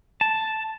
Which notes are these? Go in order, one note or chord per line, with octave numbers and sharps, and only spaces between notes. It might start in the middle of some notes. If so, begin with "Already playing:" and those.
A5